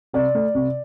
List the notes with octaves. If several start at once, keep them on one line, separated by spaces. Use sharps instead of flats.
C3 D5
A3
C3